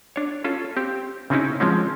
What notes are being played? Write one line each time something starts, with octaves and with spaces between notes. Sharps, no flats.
D4 C#5
C#4 F4 A4
C4 G4
C#3 C4 C#4 D#4 E4
F3 G#3 C4 C#4